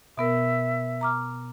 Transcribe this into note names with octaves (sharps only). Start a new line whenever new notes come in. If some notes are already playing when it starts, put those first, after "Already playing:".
B2 B3 A#4 E5
A#5 D6 F6